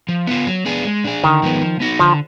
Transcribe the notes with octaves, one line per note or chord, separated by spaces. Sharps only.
F3
B3 F4
F#3
B3 D4 G#4
G#3
D4 G#4
D3 D#3
F3 G#3 B3
F3
B3 D#4 F#4
D3 F3